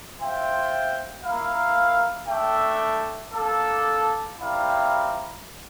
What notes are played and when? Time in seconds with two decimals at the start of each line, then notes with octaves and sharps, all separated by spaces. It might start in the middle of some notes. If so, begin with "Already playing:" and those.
0.19 F4 C5 E5 G5
1.23 A#3 E4 A#4 F5
2.28 A3 D4 A4 E5 G5
3.33 A#3 D4 A4
4.39 G3 C4 E4 A#4 F5